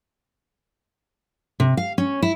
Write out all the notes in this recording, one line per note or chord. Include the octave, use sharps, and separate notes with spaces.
C3
F5
C#4
E4